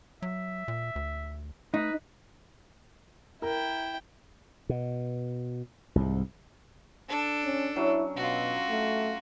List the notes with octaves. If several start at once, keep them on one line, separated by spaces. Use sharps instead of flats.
F#3 E5
A#2
D2
A3 D#4 B4
E4 A#4 G5
B2
C2 G#2
D4 A4
C#4
F#3 C#4 E4
B2 F4 F#4
A3